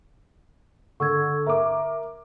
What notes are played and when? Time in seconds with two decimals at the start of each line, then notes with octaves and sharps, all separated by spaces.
1.00 D3 C#6 E6 G#6
1.46 A#4 E5 D6